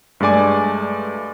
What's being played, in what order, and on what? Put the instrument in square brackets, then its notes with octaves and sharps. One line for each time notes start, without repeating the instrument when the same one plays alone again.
[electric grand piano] G2 G#3 A3 D5 G#5 D6